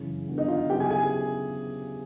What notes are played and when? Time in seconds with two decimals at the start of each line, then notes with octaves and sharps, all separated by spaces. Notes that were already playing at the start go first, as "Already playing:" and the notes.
Already playing: F#2 C#3 E3
0.27 G2 D3 F#3 B3
0.38 D#4 D#5
0.48 F4 F5
0.69 C#3 F#3 B3 E4 G4 G5
0.80 G#4 G#5
0.90 G#4 G#5